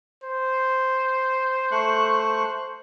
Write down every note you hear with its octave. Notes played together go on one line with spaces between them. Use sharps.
C5
A3 C#6 F#6